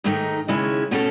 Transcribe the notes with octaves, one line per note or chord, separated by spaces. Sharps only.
G#2 D#3 A3 D#4
D#2 C#3 G#3 C#4 E4
B2 A3 C#4 F#4 A4